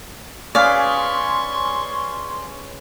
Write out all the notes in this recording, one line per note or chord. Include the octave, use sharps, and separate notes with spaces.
C#4 G#4 B4 D5 F5 C6 C#6